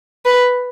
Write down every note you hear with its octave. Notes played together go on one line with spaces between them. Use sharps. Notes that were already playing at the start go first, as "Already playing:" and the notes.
B4